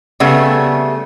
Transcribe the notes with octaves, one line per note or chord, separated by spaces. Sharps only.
C#3 G3 A3 B3